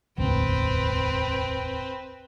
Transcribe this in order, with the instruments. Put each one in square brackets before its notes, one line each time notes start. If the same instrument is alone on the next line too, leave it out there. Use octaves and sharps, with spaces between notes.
[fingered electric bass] E1 A1 D2 [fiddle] C4 B4